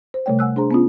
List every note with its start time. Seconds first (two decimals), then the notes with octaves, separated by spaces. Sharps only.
0.14 C5
0.26 C3 G3 A3 C#5 G5
0.39 F#5 G#5 E6 F#6
0.56 D4 G#4 C5 A#5 C6
0.71 B3 C#4 F4